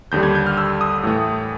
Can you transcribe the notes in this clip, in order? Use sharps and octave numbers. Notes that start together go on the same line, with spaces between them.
D#2 D3 G3 G6
G#6
G6
F6
E6
D#6
A2 E3 A3